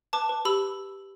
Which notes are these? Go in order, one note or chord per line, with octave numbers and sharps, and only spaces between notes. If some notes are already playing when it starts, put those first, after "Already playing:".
B4 A5 D6
B4
G4 B5 E6